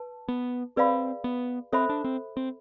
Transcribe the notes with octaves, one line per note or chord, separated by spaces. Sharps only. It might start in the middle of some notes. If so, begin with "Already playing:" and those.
Already playing: B4 A5
B3
C4 G#4 B4 D5 F5 B5
B3
C4 A4 C5 E5 B5
D4
C4
C4